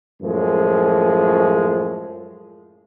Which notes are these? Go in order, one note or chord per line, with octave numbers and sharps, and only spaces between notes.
F#2 A2 F3 G#3